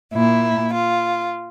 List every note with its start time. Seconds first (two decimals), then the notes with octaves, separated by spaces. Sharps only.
0.12 A#2 E4
0.73 F4